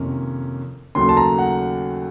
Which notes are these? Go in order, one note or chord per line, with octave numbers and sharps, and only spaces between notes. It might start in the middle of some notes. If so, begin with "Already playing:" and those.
Already playing: F2 C3 D#3 A#3 C#4
D#2 C#3 F#3 A3 C6
A5
A#5
F#5